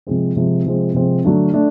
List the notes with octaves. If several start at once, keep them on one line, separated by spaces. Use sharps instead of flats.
C3 F3 G#3 C4
C3 F3 G#3 C4
C3 F3 G#3 C4
C3 F3 G#3 C4
D3 F#3 A3 D4
A3 D4